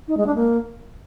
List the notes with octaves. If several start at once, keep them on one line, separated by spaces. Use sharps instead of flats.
D#4
G#3
D4
A#3